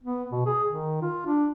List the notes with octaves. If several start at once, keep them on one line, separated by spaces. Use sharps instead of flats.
B3
B2
G#4
D#3
F4
D4